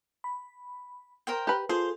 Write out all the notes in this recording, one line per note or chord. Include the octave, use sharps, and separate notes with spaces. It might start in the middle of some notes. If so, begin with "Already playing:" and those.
B5
A#4 C5 G5
G4 B4 B5
F4 G#4 A4 C5